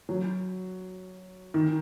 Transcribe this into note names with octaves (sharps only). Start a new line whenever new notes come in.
F#3
D#3